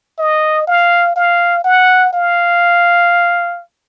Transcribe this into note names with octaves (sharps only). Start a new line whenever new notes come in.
D#5
F5
F5
F#5
F5